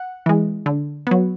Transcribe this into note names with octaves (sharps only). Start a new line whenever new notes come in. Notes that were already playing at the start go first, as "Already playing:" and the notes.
Already playing: F#5
E3 G#3
D3
F#3 B3